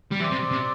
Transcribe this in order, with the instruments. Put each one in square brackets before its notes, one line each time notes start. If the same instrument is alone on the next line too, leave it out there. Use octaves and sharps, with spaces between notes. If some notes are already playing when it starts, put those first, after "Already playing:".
[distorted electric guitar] G3
[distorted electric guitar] E3 [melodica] C4 G4 D5
[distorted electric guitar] C3
C3